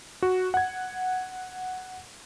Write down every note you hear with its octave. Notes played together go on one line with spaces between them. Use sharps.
F#4
F#5 G#6